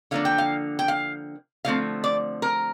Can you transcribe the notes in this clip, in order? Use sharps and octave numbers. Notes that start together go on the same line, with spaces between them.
D3 F3 A#3 D4 F5
G5
F5
G5
F5
D3 F3 A3 C4 F5
D5
A#4